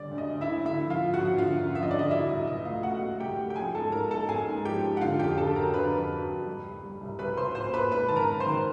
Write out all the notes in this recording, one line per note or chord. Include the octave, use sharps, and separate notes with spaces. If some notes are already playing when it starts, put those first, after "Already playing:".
Already playing: D2 D3 G3 D5
D2
D#5
D2
E4 E5
D2
D3 E4 E5
F3
F4 F5
F3
F#4 F#5
F3
D3 F4 F5
F#2
F3 E5
D#5
D3 D5
D#5
F#3 E4 E5
C2 D#5
B2 D#5
A3 F4 F5
A3 F#4 F#5
A3
C2 G4 G5
A3
G5
F3 G#4 G#5
G#2 A4 A5
G#2 A#4 A#5
G#2 A4 A5
G#2 G#4 G#5
G#2
F3 G4 G5
G#2
F#5
D3 F4 F5
F2 G4 G5
D3 A4 A5
F#3 A#4 A#5
D3 B4 B5
F2
F#3
F2
G3
C2
G3
C2
C2 B4 B5
C2 C5 C6
A#2 C5 C6
A#2 B4 B5
G#2 B4 B5
D#3 A5
A#4 A#5
D#3
C5 C6
D#3